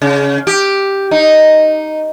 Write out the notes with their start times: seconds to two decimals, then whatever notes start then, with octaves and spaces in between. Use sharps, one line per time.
0.02 C#3
0.47 G4
1.11 D#4